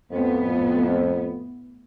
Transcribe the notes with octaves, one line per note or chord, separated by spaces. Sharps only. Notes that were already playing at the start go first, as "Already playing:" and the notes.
F2 A2 B3